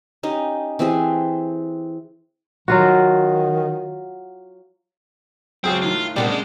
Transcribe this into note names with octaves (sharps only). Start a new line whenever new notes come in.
C#4 D#4 G4
E3 C4 G4 G#4
D#3 F#3 F4 F#4
C#2 F#3 C4 G#4 G5
A2 D#3 F4
F#6
C3 G3 G#3 A#3 B3 D4 G5
G#3 C#4